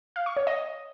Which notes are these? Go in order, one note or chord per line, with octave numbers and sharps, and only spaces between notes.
F5
C#6
C#5
D#5